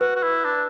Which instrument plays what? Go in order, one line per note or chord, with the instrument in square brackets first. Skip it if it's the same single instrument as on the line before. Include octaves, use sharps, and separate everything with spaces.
[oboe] F#4 [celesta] B4
[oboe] F#4
E4
D4